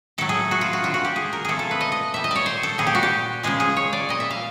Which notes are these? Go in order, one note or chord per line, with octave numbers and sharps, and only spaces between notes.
A2 F#3 A3 A4
G#4
F#4
F4
F#4
D3 G3 F4
F#4
G4
G#4
A#4
C3 F3 A3 G#4 A4
A4
B4
D#5
D#5
A#2 G3 E5
D#5
C#5 D5
C5
A4
A#2 G3 G#4
G4
F#4
G4
C#3 F3 G#3 G#4
G#4
C#5
D5
A#2 G3 D#5
E5
F5